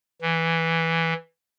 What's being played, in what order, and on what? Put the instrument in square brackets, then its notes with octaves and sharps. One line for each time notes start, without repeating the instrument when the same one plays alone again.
[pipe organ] E3